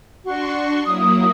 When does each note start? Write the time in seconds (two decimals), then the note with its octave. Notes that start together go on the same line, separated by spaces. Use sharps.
0.25 D4 F#4 C6 C#6
0.85 F#3 A#3 E4 D#6